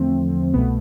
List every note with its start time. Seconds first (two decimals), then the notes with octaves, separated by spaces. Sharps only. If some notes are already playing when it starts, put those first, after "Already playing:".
Already playing: E2 D3 F3 A3 C4
0.54 C2 B2 A3 B3